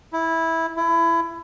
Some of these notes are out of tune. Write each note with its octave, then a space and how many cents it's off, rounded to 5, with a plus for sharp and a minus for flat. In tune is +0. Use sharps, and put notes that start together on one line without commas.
E4 -10
E4 +25